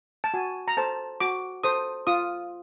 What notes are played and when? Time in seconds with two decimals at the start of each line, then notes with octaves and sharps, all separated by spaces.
0.24 A5
0.34 F#4 G#5
0.68 A#5
0.77 A4 C5 A5
1.20 F#4 D6
1.64 A4 C5 D#6
2.07 F4 D#6